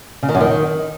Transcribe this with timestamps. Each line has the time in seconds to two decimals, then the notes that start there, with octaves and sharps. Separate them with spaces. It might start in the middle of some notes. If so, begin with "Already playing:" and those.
0.23 C#3
0.29 D#3
0.35 F#2
0.41 D#3